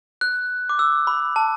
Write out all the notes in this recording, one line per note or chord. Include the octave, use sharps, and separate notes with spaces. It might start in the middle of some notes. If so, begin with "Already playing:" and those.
F#6
D6
E6
B5
A5